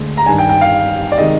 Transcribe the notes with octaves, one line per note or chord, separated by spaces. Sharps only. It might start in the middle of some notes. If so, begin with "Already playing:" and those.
Already playing: D2 D3 G#3
A#5
G2 D#3 G3 D4 G#5
G5
G5
F5
D5
C3 D#3 G#3 D#5